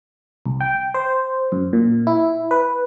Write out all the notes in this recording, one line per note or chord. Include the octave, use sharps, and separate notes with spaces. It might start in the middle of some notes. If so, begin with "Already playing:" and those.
C2
G5
C5
F#2
A#2
E4
B4